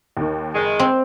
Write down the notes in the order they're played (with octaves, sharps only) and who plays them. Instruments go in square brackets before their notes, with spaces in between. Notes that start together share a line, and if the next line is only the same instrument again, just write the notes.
[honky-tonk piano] D#2 D#3
[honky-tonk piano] F#1 [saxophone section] D#3 G#3
[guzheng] C4